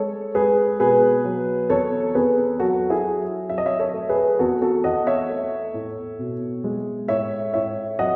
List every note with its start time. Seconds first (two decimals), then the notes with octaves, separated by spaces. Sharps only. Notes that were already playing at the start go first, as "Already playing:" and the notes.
Already playing: G#3 A4 C#5
0.35 G#3 G#4 B4
0.80 B2 G#4 B4
1.25 F#3
1.70 E2 A4 C#5
2.15 E2 G#4 B4
2.60 F#3 F#4 A4
2.90 E4 G#4
3.04 F#3
3.49 F#3 E5
3.58 D#5
3.66 C#5 E5
3.79 A4 C#5
3.94 A3
4.09 G#4 B4
4.39 E2 F#4 A4
4.62 F#4 A4
4.84 E2 D#5 F#5
5.07 C#5 E5
5.29 A3
5.74 A2
6.19 B2
6.64 G#3
7.08 A2 C#5 E5
7.53 A2 C#5 E5
7.99 F#3 D#5 F#5